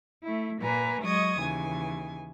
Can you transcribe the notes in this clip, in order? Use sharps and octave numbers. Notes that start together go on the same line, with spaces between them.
A3 E4
A#2 A#3 B4 G#5 A#5
F#3 G#3 D#5 C#6 D#6 G#6
D#2 C#3 E3 G#5